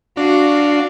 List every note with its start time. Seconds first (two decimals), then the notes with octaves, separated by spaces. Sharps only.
0.17 D4 F#4 F5